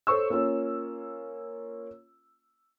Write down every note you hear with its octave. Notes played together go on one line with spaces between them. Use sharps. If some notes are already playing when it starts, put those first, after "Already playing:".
A4 C5 C#5 C#6 E6
A#3 C#4 F4 C#5